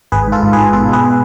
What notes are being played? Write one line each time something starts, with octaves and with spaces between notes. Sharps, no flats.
G#1 G#4 B4
G#2 F4 A4
G#1
G#4 B4
G#2
B2 F4 A4
G#3 G#4 B4
B2